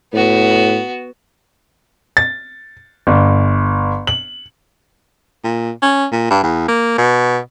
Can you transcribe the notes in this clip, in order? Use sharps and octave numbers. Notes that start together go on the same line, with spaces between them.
A2 B3 F#4
A6
G1
F#7
A#2
C#4
A#2
G2
E2
A#3
B2